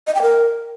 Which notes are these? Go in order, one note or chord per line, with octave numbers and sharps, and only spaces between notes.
D#5
G5
A#4